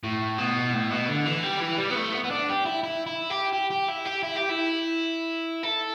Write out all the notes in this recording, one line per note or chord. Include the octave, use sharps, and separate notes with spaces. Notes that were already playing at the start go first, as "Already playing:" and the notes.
A2
B2
A2
B2
D3
E3
G3
E3
G3
B3
A3
B3
B3
D4
G4
E4
E4
E4
G4
G4
G4
E4
G4
E4
G4
E4
A4